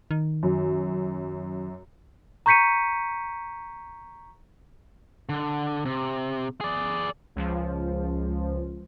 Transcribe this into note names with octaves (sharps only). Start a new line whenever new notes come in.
D#3
F#2
A#5 C#6 G6 B6 C#7 D#7
D3
C3
G#4 D5
C#2 F3